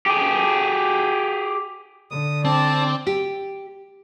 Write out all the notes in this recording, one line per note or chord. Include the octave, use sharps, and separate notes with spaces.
G4 G#4
D3 D#6
C4 D4 D5 A5
G4